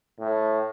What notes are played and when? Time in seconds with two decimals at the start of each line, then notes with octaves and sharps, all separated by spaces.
0.19 A2